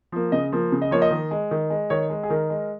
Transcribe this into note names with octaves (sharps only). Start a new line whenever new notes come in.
F3 A#3
C#3 D#5
F3 A#3
C#3
D#5
F3 A#3 C#5
D#5
D#3
G#3
D#3
G#3
D#3 C#5
G#3
G#4
D#3 A#4
G#3